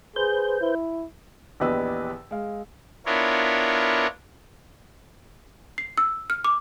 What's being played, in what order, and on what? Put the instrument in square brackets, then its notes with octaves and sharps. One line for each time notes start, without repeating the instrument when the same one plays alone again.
[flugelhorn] G#4 [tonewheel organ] B4 C5 G6
[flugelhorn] E4
[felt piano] A#1 E2 G4 B4 D#5 E6
G#3 F5
[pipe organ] B3 D4 E4 F4 A#4 C#5
[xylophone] C7
E6
F6
D6